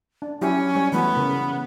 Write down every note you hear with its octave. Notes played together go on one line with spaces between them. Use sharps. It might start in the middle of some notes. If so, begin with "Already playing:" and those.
D4
F#3 C#4 E4 G4
G3 C#5
E3 A3 B3 F#4
C#3 A#4